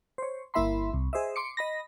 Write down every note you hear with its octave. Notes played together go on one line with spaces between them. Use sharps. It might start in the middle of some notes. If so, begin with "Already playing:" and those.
C5 C#5
G1 A#3 E4 E5 B5 C6
C2
G#4 C5 D#5 E5
C6 D6 C#7
D#5 B5 A#6